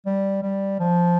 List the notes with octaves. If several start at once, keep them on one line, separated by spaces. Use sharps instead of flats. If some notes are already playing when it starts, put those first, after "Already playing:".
G3
G3
F3